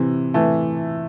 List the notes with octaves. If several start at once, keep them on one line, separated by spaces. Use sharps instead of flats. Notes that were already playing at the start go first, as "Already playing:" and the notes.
Already playing: C3 E3
E3 A3